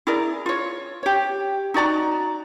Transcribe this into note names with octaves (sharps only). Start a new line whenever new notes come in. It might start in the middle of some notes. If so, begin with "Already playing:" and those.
E4 G#4 A#4 D5
F4 C#5
G4 C#5
D#4 F#4 D5 A#5